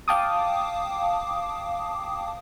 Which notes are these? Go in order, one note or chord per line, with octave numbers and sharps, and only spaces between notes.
F5 G5 A5 D6 D#6